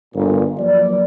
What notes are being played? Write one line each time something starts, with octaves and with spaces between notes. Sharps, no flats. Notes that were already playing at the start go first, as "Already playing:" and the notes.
G1 A#2
F3 F#3 A#3 D5